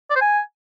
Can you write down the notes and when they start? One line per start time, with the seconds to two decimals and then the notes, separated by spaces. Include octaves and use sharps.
0.10 D5
0.16 C5
0.21 G#5